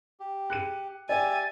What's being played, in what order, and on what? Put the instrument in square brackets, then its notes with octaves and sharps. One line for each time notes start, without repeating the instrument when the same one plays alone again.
[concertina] G4
[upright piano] F#6 C#7 D#7
[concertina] G4 E5 [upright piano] D5 [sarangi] G#5 [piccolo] A6